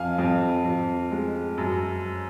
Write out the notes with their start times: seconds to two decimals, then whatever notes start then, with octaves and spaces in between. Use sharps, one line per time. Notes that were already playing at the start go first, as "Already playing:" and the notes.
Already playing: F2 F5 G#5
0.18 F2
0.64 F2
1.11 G#3
1.57 F#2